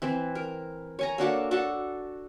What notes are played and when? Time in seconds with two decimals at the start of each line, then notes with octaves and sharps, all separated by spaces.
0.02 E3 C4
0.35 A#4
0.99 C#5 G#5 A#5
1.18 A#3 D4 F#4 A4
1.51 D4 F#4 A4